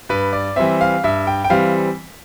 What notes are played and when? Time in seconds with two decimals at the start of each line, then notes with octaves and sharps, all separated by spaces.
0.09 G2 B4
0.33 D5
0.56 E3 G3 C4 E5
0.81 F5
1.04 G2 E5
1.27 G5
1.44 G5
1.50 E3 G3 C4 F5